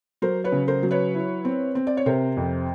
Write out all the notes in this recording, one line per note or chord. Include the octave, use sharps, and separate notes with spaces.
F#3 A#4 C5
B4 C#5
C#3
A#4 C5
F#3
B4 C#5
E4
C4
C4
D5
C#5
C3 A#4 C5
F2